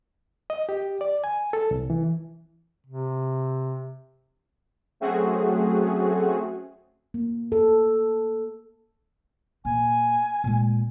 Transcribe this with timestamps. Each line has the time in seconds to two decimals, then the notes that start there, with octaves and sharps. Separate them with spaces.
0.50 D#5
0.69 G4
1.01 D5
1.24 G#5
1.53 A4
1.71 C2
1.90 E3
2.87 C3
5.00 F#3 A3 C4 C#4 F#4 G#4
7.14 A#3
7.52 A4
9.65 A#2 G#5
10.44 A#2 G#3